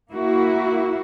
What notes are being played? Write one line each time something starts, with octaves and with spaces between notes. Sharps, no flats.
A#3 E4 F#4